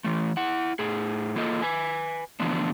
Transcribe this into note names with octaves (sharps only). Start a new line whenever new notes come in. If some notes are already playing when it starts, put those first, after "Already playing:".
E3 A3
E4 F#5
A2 G#4
E2 A#3 F4 A4 D#5
B4 G#5
D3 E3 F3 A3 B3 D4